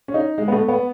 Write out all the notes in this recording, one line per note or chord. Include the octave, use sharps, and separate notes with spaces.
C#4
D#4
G#3
B3
A3
B3